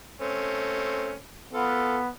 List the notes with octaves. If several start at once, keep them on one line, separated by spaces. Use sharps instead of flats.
A3 C4 C#4
B3 F4 A4